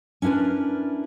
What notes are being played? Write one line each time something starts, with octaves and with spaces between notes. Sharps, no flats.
C#4 D4 E4 A#4 B4